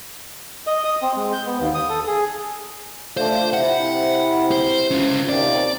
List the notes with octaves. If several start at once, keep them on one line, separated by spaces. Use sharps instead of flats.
D#5
D#6
C4
G#3
G6
B3
D#2
D#6
A4
G#4
A3 D4 F4 C5
C3 C4 E4 F#5
C5
C#4 F4
D#2 C3 D5